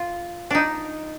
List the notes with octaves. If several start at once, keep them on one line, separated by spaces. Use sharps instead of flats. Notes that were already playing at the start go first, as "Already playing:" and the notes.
Already playing: F4
D4 D#4